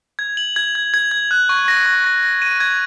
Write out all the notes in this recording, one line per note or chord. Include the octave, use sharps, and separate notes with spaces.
G#6
F#7
G#6
G#6
G#6
G#6
F#6
C#6
A#6
C#6
A#6
A#6
D#7
G#6